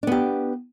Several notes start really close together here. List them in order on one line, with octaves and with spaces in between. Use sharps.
D4 B3 G4